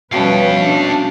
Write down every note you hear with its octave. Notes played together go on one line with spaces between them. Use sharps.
B2 F3 G3 A3 C#4 B4 F5 G5
C3 D4